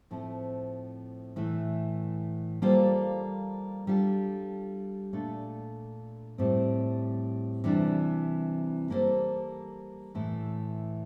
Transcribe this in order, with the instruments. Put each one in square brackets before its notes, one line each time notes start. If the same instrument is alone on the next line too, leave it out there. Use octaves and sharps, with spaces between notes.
[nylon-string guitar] A2 F3 A3 C4
A2 E3 A3
G3 A#3 F4 A4 C5
G3 D4 F4 A4
A#2 A3 D4 A4
A2 G3 C4
C3 E3 G3 D4
G3 A#3 E4 A4 C5
A2 E3 A3 E4